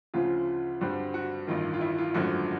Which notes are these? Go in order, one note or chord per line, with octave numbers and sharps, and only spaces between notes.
D2 C#3 F3 F4
G2 D3 G3 C4 F#4
F#4
A1 G2 D#3 F4
F4
E4
F4
G#1 F#2 D3 F3 A3 F#4